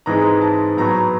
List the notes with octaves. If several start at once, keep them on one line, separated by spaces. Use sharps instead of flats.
G#2 E3 G#3 C4 A#5
A5
A2 F#3 B3 A#5